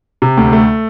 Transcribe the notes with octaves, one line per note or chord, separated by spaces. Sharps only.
C3
D2
A3